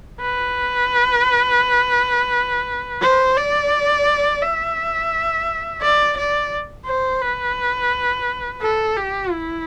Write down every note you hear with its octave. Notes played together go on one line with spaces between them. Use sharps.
B4
C5
D5
E5
D5
D5
C5
B4
A4
G4
E4